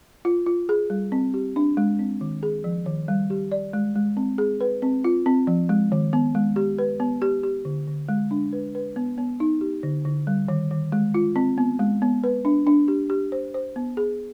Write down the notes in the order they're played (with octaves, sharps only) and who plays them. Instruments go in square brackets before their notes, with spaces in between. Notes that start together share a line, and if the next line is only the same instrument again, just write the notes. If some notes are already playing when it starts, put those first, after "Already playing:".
[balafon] F4
F4
G#4
G3
C4
G4
D4
G#3
C4
D#3
G#4
F3
D#3
G3
G4
D5
G#3
G#3
C4
G#4
B4
C4
F4
C4
F3
G#3
D#3
B3
G#3
G4
B4
B3
G4
G4
D3
D3
G#3
D4
B4
B4
B3
B3
D#4
G4
D3
D3
G3
D#3
D#3
G#3
F4
C4
B3
G#3
B3
B4
D4
D4
G4
G4
C5
C5
B3
G#4